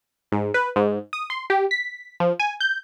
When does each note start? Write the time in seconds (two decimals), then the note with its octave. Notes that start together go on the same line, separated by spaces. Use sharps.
0.32 G#2
0.54 B4
0.76 G#2
1.13 D#6
1.30 C6
1.50 G4
1.71 B6
2.20 F3
2.40 G#5
2.60 G6